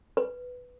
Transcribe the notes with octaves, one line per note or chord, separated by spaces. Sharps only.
B4